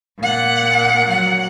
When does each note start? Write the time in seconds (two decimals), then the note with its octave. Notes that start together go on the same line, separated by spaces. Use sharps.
0.20 A#2 F#5
1.10 F#3 F#5